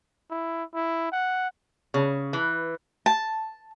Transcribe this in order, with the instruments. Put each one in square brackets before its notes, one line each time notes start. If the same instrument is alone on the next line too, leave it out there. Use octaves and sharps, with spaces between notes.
[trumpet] E4
E4
F#5
[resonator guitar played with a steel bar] C#3
E3
[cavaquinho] A5